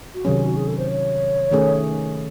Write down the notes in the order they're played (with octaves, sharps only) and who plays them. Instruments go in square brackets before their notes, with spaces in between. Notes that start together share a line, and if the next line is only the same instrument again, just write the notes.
[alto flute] F#4
[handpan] C3 D#3 F#3 C#4 [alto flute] G#4
[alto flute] F#4
G#4
A4
C5
C#5
[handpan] D#3 A3 C#4 G#4